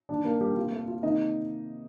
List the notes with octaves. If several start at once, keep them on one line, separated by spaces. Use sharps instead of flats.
G2 D#3 A#3 D4 D5
A#3 A#4
G3 G4
C3 G3 A#3 F4
A3 A4
F4
C3 D#3 A#3 D#4 D#5